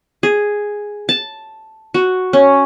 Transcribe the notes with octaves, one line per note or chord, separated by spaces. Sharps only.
G#4
A5
F#4
C#4